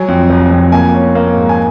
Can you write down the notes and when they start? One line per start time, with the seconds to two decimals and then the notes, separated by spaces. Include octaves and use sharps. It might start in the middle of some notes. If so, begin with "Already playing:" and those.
Already playing: F#3 G#5
0.08 F2
0.30 F1
0.51 F2
0.72 A#3 G#5
0.94 C#4
1.15 A#3
1.36 G#2
1.49 G#5